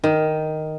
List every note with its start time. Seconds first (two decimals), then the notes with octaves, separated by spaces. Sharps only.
0.04 D#3